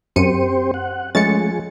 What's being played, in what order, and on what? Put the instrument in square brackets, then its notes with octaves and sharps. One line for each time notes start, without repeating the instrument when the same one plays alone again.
[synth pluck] F#2 C#7 D#7 [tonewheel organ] C4 G4 C5
[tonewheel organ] F#5
[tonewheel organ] F3 G#4 [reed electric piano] G#3 A3 C#4 [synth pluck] A6 C#7